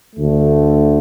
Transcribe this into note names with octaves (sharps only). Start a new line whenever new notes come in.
D2 D3 A3